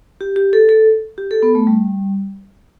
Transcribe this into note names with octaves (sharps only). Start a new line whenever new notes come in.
G4
G4
A4
A4
G4
A4
B3
A3
G3